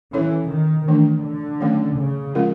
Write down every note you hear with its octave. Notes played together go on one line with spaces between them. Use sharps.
E3 C#4 E4 A4 C#5
D#3
D#3 E3 A3 D4
D3
D#3 F#3 A3 C#4
C#3
F3 G#3 C#4 F4 A#4